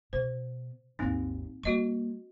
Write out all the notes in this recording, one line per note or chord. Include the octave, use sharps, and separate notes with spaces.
B2 C5
G#1 D#2 A#3 C4 D#4
G3 A#3 F#4 D#5 C#6